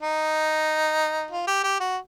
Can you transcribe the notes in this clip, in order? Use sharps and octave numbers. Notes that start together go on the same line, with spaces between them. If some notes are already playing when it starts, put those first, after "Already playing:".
D#4
F4
G4
G4
F#4